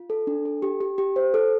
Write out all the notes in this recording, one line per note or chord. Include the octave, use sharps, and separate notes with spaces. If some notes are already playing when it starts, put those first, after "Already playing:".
Already playing: F4
A4
D4
A4
G4
G4
G4
C5
A4